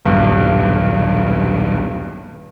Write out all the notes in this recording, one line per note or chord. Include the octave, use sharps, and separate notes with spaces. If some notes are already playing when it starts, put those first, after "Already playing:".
D#1 B1 G2